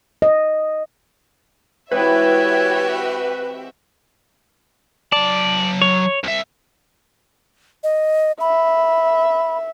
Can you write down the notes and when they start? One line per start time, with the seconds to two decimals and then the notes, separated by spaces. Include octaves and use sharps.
0.22 D#5
1.92 E3 G#3 C4 F#4 G4 B4 C#5 E5
5.12 F#3 D5 A5
5.82 C#5
6.23 C2 E5
7.84 D#5
8.41 E5 B5